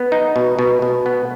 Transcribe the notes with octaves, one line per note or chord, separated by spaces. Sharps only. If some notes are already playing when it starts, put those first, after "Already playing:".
Already playing: B3
D#4
B2
B2
B2
B3